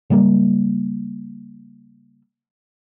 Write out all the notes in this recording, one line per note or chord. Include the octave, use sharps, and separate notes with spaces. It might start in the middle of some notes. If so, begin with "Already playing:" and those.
C#3 F#3 G3 A#3